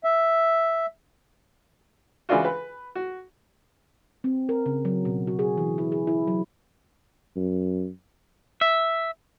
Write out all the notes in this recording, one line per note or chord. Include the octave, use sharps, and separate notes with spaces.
E5
C#3 E3 G#3 D4 F4 F#4
B4
F#4
C4
A#4
C#3
F#3
B2
F#4
G#4
E3
E4
G#4
E4
F#3
F#2
E5